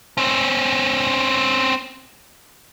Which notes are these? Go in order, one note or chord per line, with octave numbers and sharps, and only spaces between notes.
C4 C#4